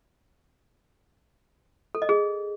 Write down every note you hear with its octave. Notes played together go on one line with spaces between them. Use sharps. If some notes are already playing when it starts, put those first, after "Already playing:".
A4
D#5
G#4